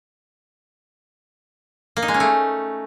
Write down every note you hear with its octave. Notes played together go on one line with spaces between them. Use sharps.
A#3
D#4
G#3
C#4
A3